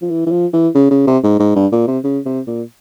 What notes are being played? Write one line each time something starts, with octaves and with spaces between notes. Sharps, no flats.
F3
E3
E3
F3
E3
C#3
C#3
C3
G#2
G#2
G2
A#2
C3
C#3
C3
A#2